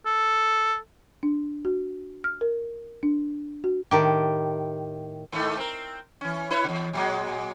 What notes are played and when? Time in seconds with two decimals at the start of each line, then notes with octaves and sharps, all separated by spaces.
0.06 A4
1.23 D4
1.65 F#4
2.24 F6
2.41 A#4
3.03 D4
3.64 F#4
3.91 A2 D#3 G4
5.32 G#2 D#3 A3
5.58 C4 A#4
6.21 E3 C#4
6.50 E4 B4 C#5
6.64 E2 C3
6.93 A#2 F#3 G#3